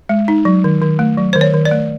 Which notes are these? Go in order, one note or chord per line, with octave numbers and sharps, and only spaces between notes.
G#3
D#4
F#3
D#3
D#3
A3
F#3
D#3 C5
C#5
D#3
D5
A3